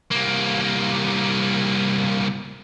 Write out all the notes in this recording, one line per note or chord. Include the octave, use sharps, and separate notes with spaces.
C2 A#3